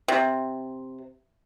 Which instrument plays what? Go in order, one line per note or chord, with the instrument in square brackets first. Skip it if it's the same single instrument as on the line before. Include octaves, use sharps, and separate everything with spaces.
[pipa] C3